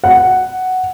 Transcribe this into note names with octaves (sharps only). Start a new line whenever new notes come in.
F#5